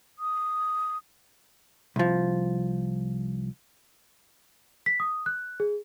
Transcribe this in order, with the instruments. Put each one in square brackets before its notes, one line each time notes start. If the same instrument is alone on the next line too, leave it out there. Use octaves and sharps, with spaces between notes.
[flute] D#6
[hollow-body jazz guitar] C2 F3
[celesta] B6
D#6
F#6
G#4